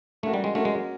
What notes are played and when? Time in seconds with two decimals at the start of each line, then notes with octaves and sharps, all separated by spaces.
0.23 A3 A#3 C#4 F#4
0.34 G3
0.44 G#3
0.55 A3 A#3 C#4 F#4
0.65 G#3